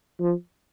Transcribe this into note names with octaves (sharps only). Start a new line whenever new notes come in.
F3